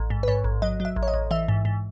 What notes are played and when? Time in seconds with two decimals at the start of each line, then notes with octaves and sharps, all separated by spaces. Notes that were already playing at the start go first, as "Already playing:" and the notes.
Already playing: A1
0.10 G#2
0.23 B4
0.28 G#2 C#5
0.44 A1
0.62 F#3 D#5
0.80 F#3
0.85 E5
0.96 A1
1.03 C#5
1.08 D#5
1.14 A1
1.31 E3 E5
1.48 G#2
1.65 G#2